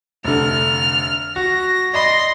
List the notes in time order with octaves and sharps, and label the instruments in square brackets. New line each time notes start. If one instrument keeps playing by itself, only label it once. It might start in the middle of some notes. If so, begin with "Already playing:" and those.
[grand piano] F1 D3 [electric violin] F6
[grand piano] F#4 [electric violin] A#6
[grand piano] D5 D#5 B5 [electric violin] C6 A#6